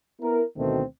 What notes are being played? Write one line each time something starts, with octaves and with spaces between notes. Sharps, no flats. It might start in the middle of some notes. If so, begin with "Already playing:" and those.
B3 E4 A#4
D2 B2 D#3 A3 C4